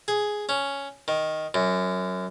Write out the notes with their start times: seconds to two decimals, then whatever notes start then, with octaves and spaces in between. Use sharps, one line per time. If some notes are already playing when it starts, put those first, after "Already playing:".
0.08 G#4
0.49 C#4
1.08 D#3
1.54 F#2